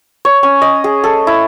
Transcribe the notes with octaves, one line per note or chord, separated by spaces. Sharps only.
C#5
C#4
D#5
G#4
A4
E4